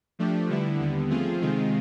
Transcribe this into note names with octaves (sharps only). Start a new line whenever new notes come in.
F3 A3 D4 G4
D3 G3 B3 E4
D#2 D3 G3 B3
F3 A3 C4 F4 G#4
C3 D#3 G#3 C4 F4